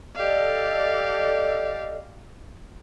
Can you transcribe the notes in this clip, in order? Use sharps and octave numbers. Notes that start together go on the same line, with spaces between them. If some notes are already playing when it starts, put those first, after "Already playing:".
G4 A4 D5 D#5 F5